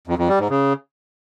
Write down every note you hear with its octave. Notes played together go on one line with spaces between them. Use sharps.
F2
F2
G3
G#2
C#3